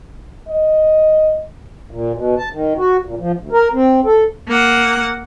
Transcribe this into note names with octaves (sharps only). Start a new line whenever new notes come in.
D#5
A#2
B2
A5
D#3
F#4
A#2
F3
D2
A#4
C4
A4
A#3 F#5